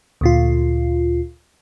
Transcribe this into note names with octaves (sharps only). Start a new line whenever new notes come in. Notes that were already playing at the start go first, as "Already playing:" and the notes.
D2 A#2 F4